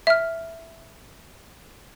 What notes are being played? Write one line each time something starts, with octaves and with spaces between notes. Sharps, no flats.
E5 F6